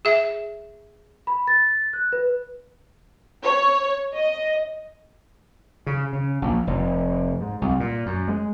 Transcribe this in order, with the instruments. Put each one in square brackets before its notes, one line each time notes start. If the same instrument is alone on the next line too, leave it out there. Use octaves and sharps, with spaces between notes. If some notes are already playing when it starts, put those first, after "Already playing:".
[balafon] G#4 E5
[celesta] B5
A6
F#6
B4
[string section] C#5
D#5
[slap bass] C#3
C#3
A#1
F1
G#2
C2
A#2
F#2
G#3